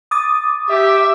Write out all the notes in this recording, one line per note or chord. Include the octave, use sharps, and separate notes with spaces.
D6 D#6 A6
G4 E5